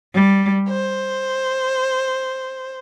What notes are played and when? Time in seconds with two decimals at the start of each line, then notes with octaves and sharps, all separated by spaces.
0.14 G3
0.68 C5